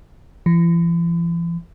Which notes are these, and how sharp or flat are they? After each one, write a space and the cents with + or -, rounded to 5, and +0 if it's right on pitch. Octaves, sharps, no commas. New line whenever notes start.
E3 +45